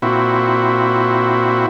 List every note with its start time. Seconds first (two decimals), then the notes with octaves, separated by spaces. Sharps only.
0.02 A#2 C4 E4 F#4